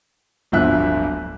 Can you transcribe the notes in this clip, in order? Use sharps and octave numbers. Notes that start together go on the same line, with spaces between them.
D1 G1 G2 F3 E5 F#6